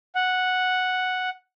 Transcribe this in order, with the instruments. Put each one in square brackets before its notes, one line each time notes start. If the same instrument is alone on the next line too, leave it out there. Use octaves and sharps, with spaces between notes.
[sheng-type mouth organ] F#5